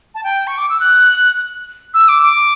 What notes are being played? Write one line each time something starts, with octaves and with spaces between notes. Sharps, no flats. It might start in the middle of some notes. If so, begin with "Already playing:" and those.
A5
G5
C#6
D6
E6
F#6
E6
D6
D6